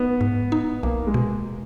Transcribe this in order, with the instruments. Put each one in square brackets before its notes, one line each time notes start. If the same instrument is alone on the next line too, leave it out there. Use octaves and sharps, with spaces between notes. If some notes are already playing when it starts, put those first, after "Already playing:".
Already playing: [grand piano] B3 [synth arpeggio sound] D#4
[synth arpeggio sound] G#2
D#4
[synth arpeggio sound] B1 [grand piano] A#3
[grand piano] G#3
[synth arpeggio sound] B2